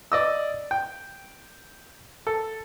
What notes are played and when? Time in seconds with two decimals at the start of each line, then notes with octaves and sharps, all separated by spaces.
0.12 D5 D#5 E6
0.71 G5
2.27 A4